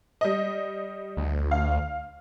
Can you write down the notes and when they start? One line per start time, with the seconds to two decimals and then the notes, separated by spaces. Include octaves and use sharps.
0.21 G3 D#5
1.17 D2
1.51 F5